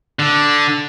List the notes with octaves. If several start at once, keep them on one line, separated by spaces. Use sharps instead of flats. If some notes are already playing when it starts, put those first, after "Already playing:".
D3